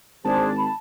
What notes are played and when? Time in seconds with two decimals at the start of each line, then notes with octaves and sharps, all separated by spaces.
0.25 G#1 D4 G#4 C5 A5
0.58 B5